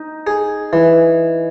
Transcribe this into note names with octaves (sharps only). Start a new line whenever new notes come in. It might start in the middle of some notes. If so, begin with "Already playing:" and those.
Already playing: D#4
G#4
E3